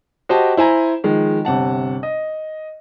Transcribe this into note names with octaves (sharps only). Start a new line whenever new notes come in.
F#4 G4 C5 D#5 G5 A5
E4 C5 G#5 A#5
D#3 F3 G#3
G1 C3 F#5 A5
D#5